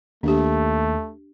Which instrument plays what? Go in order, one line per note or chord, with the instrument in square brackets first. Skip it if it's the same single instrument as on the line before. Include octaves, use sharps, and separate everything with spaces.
[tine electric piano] D#2 [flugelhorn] A3 [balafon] D4 G4